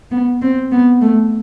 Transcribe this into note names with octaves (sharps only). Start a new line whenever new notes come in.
B3
C4
B3
A3